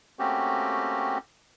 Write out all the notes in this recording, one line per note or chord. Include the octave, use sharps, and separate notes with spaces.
A3 A#3 C4 C#4 F#4 G4